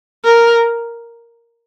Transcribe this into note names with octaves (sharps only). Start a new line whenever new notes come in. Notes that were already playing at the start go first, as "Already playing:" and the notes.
A#4